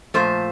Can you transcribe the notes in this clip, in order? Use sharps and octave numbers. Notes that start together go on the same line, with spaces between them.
A#2 F3 A3 C5